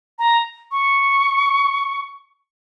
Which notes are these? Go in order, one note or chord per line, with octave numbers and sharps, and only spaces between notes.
A#5
C#6